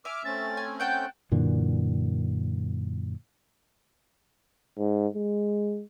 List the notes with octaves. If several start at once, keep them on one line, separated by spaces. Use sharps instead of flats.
E5 G#5 D6 F6
A3 C4 C#4 A6
G#5
F#5 G5 A5 G6
F#2 A#2 D3 E3
G#2
G#3